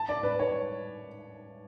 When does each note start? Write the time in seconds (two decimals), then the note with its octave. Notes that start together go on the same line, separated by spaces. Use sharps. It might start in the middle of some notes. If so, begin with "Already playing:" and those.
Already playing: A5
0.09 D5
0.23 B4
0.39 C#5